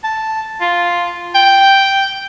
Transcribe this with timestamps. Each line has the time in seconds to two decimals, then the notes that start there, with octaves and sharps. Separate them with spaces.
0.04 A5
0.61 F4
1.35 G5